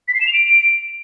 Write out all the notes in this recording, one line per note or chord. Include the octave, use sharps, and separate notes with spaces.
B6
C7
E7
F7
D7